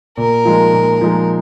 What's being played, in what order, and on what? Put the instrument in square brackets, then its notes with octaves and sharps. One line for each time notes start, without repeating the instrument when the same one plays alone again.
[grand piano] A#2 [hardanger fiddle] A#4
[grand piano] F3 G#3 D#4
A#2
F3 G#3 D#4